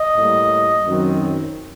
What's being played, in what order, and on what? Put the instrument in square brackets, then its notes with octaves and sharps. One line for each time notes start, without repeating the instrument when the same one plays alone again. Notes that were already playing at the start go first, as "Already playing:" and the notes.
Already playing: [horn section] D#5
A2 G3 A#3
F#2 D#3 F#3 C4